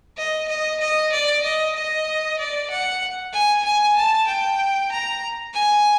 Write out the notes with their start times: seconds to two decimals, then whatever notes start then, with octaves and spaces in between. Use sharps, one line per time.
0.17 D#5
0.48 D#5
0.80 D#5
1.12 D5
1.43 D#5
1.75 D#5
2.38 D5
2.70 F#5
3.33 G#5
3.65 G#5
3.96 A5
4.27 G5
4.91 A#5
5.54 G#5